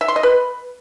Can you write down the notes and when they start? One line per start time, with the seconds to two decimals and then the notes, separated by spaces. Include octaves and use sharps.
0.01 E5
0.08 C6
0.16 D#5
0.23 B4